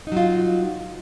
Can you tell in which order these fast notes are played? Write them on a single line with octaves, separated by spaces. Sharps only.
D#4 F#3 F4